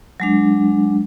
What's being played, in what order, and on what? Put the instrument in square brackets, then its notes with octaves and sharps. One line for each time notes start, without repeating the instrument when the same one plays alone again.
[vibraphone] F#3 G#3 D4